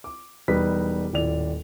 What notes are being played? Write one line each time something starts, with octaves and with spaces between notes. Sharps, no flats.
D6
E1 G3 D#4 B4 B6
D#1 A2 D5 F7